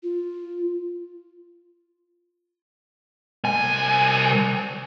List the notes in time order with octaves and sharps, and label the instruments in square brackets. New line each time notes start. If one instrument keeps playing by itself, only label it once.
[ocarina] F4
[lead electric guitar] C2 G#5